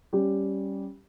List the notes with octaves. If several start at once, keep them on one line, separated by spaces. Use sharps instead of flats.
G3 C#4 G4